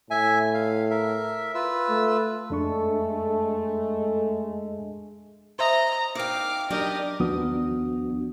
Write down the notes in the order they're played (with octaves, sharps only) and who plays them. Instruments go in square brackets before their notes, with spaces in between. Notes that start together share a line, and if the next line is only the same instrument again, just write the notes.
[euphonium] A2 [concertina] E5 G#5
[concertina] F5
A#4 E5
F4 B4 E6
[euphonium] A3
[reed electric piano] F2 D4 C#6 [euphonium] G#3 [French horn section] A3 [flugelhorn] A4
[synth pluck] C5 E5 [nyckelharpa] D#5 [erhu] A#5
[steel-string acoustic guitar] D#4 G5 [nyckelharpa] F5 [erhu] D6
[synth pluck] F#3 [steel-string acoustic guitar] D4 [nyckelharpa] G4 A#4 [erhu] D#5
[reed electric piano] D#2 F3 B3 D4 F#4 D#6